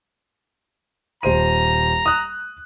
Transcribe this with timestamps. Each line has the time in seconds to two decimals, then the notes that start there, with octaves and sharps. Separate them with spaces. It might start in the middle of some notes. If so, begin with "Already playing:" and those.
1.23 D#1 C5 A#5 D#7
2.06 D#6 F#6